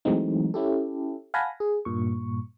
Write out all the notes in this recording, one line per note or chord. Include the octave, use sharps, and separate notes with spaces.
E3 F#3 G#3 A3 C4 D#4
C#4 E4 G4 A4
F5 F#5 G#5 A5 B5 A#6
G#4
G2 A#2 C#6